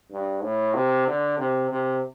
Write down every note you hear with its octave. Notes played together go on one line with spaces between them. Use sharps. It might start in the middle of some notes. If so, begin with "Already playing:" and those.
G2
A2
C3
D3
C3
C3